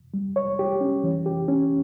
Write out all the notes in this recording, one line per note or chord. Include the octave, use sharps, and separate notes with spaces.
G3
C#5
G4
C#4
E3
G4
C#4